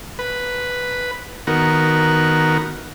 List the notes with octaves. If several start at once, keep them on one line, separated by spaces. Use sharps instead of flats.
B4
D#3 B3 F#4 A#4